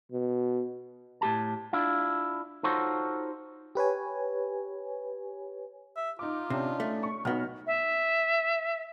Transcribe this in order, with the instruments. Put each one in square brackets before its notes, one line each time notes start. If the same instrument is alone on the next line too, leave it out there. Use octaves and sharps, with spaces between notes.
[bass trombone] B2
[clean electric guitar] A2 G4 A5
D4 E4 F4
D#4 F4 F#4 A4 C5 C#5
[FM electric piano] G4 B4 C#5 G#5
[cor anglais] E5
[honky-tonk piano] D#4 D6 [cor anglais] F4
[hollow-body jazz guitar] C3 [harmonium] C#4 D4
[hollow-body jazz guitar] A3
[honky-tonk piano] C#6
[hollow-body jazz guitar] B1 B3 [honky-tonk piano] D#4 F#4 F6
[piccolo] E5